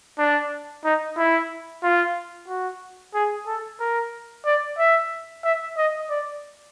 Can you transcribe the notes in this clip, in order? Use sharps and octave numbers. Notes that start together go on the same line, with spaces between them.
D4
D#4
E4
F4
F#4
G#4
A4
A#4
D5
E5
E5
D#5
D5